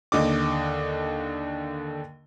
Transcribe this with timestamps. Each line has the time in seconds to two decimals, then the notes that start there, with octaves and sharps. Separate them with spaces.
0.12 D#2 D3 D#5 D6